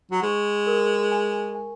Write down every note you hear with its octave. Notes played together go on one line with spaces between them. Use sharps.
F#3
G#3 C#6
A#4
G#5
G#5